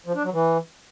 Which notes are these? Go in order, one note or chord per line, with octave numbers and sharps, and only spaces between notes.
F3
D4
F#3
E3